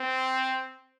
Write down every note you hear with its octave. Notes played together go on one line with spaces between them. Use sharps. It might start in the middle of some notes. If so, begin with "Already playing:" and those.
Already playing: C4